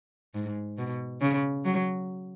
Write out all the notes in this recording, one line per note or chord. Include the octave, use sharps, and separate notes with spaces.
G#2
B2
C#3
F#3